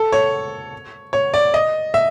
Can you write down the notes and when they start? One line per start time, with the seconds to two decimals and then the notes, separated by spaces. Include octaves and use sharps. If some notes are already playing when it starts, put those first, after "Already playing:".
Already playing: A4
0.12 C#5
1.13 C#5
1.34 D5
1.54 D#5
1.94 E5